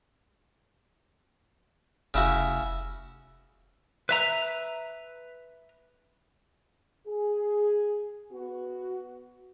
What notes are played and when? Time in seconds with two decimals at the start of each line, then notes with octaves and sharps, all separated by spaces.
2.14 F1 C#3 E4 F#4
4.09 B4 E5 A#5
7.07 G#4
8.32 B3 F#4